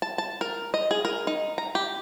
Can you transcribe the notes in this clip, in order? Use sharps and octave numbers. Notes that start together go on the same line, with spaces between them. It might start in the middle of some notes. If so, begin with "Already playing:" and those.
A5
A5
A#4
D#5
G#4
A#4
D#4
A#5
G4